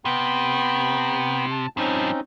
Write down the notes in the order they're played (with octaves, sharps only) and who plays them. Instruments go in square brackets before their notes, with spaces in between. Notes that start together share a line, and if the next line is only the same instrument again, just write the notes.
[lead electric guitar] C3 [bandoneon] B3 G5 B5
[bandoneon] A5
[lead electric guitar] G2 F3 [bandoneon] C4 C#4 D#4